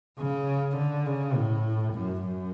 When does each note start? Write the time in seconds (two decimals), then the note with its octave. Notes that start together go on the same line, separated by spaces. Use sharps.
0.19 C#3
0.77 D3
1.06 C#3
1.35 A2
1.94 F#2
2.22 F#2